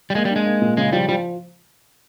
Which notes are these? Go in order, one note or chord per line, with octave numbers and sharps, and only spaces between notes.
G3
G#3 A#3
G3
D4
G#3
A#3
A#2
C#3 G#3
F3 G3
F3 G3